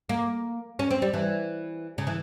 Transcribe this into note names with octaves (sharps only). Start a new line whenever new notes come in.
A#3
C#4
C4
G3
E3
C#3
E3